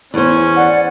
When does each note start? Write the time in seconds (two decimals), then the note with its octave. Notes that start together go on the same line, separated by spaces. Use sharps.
0.14 E2 C#4 C5
0.56 D5 F#5